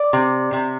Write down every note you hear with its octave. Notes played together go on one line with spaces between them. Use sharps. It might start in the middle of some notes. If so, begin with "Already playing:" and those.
Already playing: D5
C3
C3